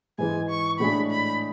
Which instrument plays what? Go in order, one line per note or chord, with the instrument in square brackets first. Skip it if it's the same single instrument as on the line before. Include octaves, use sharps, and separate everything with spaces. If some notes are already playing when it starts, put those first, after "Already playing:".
[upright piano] G#2 E3 G#3 [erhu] G#5
[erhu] C#6
[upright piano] A2 G#3 D4 G#4 [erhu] B5
[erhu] B5